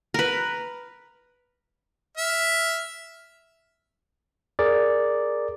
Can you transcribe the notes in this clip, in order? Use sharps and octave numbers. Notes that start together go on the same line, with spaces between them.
A#4 B4
E5 F6
G#4 A#4 D5